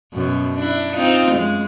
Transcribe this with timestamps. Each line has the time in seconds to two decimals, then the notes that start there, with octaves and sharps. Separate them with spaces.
0.14 F#2 B2
0.56 D4 E4
0.96 C4 D#4 F4
1.31 F#2 G#3